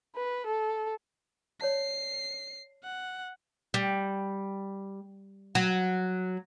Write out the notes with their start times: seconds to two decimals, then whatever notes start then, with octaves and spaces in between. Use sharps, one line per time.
0.16 B4
0.46 A4
1.61 C#5 D5 A5 C7
2.84 F#5
3.74 G3
5.55 F#3